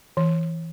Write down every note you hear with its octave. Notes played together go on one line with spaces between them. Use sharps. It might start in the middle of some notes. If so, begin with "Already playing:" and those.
E3